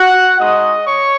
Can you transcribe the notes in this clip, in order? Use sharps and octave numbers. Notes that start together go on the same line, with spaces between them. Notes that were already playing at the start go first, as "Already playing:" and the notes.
Already playing: F#4 F#5
G#3 D#4 F#4 D#5 D#6
C#5 C#6